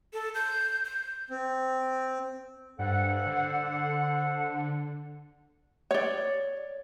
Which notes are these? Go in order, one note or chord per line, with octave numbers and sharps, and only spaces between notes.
A4
G6
G6
C4
G2 A4 C5 F#5
D3
C#5 D5